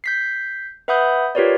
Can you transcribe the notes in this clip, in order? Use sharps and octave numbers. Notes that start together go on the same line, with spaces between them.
G6 B6 C7
B4 E5 F#5 B5 D#6 G6
F4 G4 A#4 B4 C#5 D5